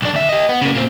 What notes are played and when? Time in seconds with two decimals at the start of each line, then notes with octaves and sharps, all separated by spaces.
0.02 B1 D4
0.14 D2 E5
0.29 G4 D#5
0.49 B3
0.62 C#3 A#3
0.75 A#2 C4